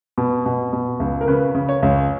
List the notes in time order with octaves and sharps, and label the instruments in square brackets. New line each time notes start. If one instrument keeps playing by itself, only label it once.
[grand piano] B2
B2
B2
C#2
A#4
C#3 B4
C#3
C#5
C#2